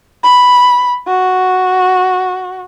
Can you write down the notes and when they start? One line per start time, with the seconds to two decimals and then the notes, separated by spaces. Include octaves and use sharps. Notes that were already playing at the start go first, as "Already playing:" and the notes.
0.23 B5
1.07 F#4